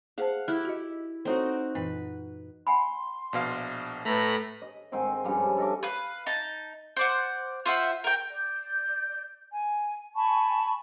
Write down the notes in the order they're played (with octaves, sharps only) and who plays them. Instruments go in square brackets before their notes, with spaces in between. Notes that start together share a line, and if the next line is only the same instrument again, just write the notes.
[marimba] G#4 C5 A5 [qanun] F5 F#5
[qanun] E4 G4 [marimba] F6 F#6
[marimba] F#4 D#5
[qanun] C4 D#4 F#4 [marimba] A4 C5 C#5
[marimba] F#2 A#2 E3 [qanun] B4
[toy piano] F#5 G#5 B5 [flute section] C6
[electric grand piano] A#1 B2 F5
[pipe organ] A2 A#5 B5 [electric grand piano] A3 [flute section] A4 B4
[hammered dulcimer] D#5
G#2 D#3 C4 G#5
G2 C#3 F3 G3
A4 D#5 E5 D6
[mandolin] B4 F5
D#4 A5
C5 D5 F#5
F4 C5 E5 F#5
A#4 G5
[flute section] D5 G6
G#5
G#5 A5 B5 C#6